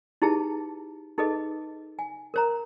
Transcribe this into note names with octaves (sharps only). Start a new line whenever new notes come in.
D#4 E4 G4 G#4 B4 A5
D#4 G#4 A4 B4 D#5
G#5
A#4 C5 A#5